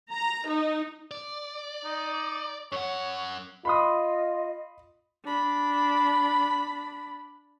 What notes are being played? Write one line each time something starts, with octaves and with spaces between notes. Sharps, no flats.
A#5
D#4
D5
D#4
F#2 C#5 F#5
F4 D#5 B5 C6 D#6
D4 B5